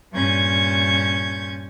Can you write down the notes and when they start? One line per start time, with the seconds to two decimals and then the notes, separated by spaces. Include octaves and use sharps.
0.13 G2 A#2 C#4 C#6 G6 G#6